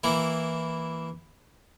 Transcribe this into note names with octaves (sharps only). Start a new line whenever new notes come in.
E3 A#3 E4